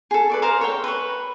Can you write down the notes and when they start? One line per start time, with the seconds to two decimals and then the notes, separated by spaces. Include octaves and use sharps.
0.11 G#4 A4
0.30 B4 D5 C#6
0.42 A#4 C5 F5 A#5
0.61 C#5 E5 G5
0.84 B4 C#6